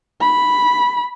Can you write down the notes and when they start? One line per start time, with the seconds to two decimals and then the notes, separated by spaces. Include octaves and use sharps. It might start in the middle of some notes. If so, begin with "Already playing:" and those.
0.21 B5